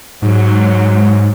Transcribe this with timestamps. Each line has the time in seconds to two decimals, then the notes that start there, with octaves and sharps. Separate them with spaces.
0.22 G#2 F#3